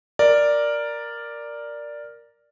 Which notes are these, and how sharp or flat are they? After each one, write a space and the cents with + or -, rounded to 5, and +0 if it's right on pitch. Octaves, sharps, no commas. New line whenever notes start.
A#4 +0 D5 +0